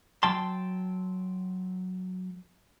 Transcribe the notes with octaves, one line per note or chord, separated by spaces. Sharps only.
F#3 G5 A5 C6